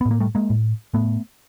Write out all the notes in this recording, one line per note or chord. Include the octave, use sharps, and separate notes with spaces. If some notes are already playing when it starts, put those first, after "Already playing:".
A2 B3
A#3
G3 A3
G#3 A#3
A2
A2 A3 B3